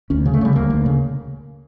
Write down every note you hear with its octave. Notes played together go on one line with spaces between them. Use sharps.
D2 C#4
C#3
A3
C#3 G3
D2 A#3
D2
C#3